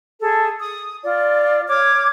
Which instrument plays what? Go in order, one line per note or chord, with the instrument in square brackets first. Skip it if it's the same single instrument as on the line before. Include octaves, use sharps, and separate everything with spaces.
[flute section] G#4 A4
D#6
F4 D5
C#5 D6 F6 G#6